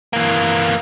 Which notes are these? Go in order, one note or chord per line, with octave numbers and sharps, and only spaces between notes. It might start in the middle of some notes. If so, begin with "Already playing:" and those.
E3 A#3